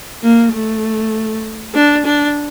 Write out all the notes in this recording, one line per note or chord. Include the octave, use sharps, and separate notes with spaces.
A#3
A3
D4
D4